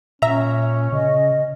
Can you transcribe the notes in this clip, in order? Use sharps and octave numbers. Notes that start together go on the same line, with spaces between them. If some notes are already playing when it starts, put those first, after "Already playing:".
A#2 C#4 E5 A#5
C#3 D#5